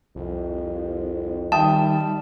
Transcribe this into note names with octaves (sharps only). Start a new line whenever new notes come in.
C2 F2
D#3 G3 E5 G5 A5 D#6